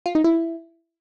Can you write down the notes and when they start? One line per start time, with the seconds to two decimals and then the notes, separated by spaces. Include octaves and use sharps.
0.06 F4
0.15 D#4
0.24 E4